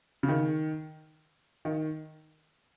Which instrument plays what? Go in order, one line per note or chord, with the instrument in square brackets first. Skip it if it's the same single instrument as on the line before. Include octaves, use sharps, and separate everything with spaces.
[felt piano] C#3
D#3
D#3